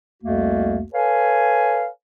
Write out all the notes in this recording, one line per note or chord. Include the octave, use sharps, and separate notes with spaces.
C2 F2 A3 A#3 F#4
A4 B4 C#5 F5 G#5